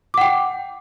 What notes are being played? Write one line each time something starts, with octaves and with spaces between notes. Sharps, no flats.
F#5 G5 D6